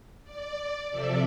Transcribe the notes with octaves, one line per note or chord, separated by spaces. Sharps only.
D5
C3 F3 A4 D5 E5